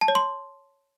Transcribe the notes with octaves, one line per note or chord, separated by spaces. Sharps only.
A5
C#5
C6